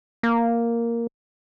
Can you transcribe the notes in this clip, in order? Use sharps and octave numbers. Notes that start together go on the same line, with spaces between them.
A#3